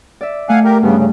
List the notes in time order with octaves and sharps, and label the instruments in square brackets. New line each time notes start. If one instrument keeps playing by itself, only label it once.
[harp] D5 E5
[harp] A3 [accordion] F5 F#5 G#5
[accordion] G4 A#4
[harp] G2 [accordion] C#3 B3
[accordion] C#3